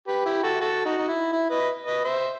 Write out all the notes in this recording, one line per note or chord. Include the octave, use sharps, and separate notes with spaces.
G4 B4
E4 G4
F#4 A4
F#4 A4
D#4 F#4
D#4
E4
E4
B4 D#5
B4 D#5
C5 E5